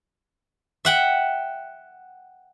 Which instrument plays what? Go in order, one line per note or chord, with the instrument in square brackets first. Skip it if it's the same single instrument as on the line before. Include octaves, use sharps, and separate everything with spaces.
[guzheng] E5 F#5 G5